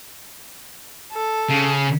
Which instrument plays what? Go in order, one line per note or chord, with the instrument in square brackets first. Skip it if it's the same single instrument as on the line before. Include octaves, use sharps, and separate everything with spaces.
[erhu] A4
[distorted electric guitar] C#3